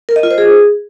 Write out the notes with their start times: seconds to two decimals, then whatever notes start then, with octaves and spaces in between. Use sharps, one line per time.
0.09 A#4
0.16 D#5
0.23 F4
0.31 C5
0.38 G#4